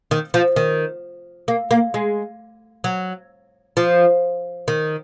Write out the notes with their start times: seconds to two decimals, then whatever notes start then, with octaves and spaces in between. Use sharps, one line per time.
0.11 D#3
0.34 F3
0.56 D#3
1.48 A#3
1.71 A#3
1.94 G#3
2.84 F#3
3.77 F3
4.68 D#3